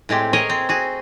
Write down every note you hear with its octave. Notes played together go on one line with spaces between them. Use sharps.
A2 G#3 C4 G4
G#4 A#4 C#5 D#5 G#5
C4
F#4 G#4